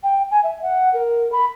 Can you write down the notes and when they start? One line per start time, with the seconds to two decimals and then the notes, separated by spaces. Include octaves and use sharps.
0.03 G5
0.30 G#5
0.43 E5
0.62 F#5
0.93 A#4
1.32 B5